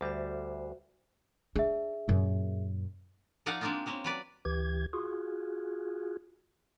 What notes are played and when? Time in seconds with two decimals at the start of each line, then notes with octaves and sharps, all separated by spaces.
0.01 D2 G3 F#4 C5 E5
1.56 D4 G#4 E5
2.08 F#2 A#2
3.46 F3 D#4 D5 F5 F#5 A#5
3.61 G#3 A#3 C4 D4 D#4 F4
3.86 G#3 A#3 C4 C#4
4.04 F#3 B4 D5
4.45 D2 E3 G4 G#6
4.93 F4 F#4 G#4